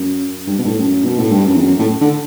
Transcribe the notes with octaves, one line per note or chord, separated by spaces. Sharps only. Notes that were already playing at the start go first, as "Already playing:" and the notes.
Already playing: F#2
G2
B2
G2
A2
F#2
B2
A2
G2
F#2
E2
F#2
A2
D3